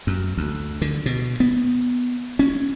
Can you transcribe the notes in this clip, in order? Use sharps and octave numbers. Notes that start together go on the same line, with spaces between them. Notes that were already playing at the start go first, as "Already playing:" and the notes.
F#2
D2
D3
B2
B3
C#4